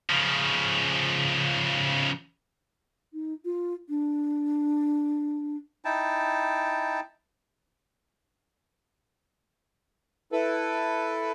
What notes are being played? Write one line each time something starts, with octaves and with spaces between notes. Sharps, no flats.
C#3 F3
D#4
F4
D4
D#4 E4 G5 A5
E4 A4 B4